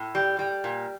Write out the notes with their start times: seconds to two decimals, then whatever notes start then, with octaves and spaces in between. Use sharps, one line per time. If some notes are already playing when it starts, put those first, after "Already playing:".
Already playing: A2
0.15 G3
0.39 G3
0.64 A#2